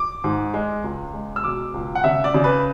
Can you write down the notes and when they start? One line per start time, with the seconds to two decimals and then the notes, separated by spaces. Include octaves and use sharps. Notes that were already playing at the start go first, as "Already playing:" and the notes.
Already playing: D6
0.24 G#2
0.54 G#3
0.84 C#2
1.14 G#3
1.36 E6
1.44 B2 D6
1.74 C#2
1.95 F#5
2.04 C#3 E5
2.24 D5
2.34 C#3
2.44 B4